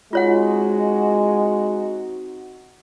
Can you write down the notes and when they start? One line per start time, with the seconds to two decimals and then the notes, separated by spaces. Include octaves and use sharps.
0.13 G#3 C4 D#4 F4 F#4 C#5 F#5